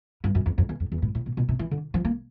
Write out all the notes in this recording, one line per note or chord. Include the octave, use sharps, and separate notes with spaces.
G2
F#2
F2
F2
E2
F2
E2
A2
A2
A#2
B2
C3
E3
D3
F3
A#3